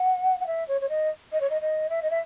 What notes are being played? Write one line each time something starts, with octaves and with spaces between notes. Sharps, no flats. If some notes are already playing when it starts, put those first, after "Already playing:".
Already playing: F#5
F#5
E5
C#5
C#5
D#5
D#5
C#5
D#5
D#5
E5
D#5
E5